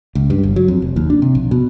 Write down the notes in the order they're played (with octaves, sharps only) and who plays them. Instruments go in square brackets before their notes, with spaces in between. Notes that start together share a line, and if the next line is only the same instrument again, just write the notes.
[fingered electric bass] C#2
G2
G1
F#3
F2
F1
D#2
D4
C3
A#1
B2